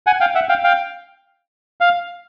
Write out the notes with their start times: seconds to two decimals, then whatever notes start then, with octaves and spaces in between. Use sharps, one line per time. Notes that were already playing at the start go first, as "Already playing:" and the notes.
0.07 F#5 G#5
0.20 F5 G5
0.35 E5 F#5
0.49 F5 G5
0.64 F5 G5
1.81 F5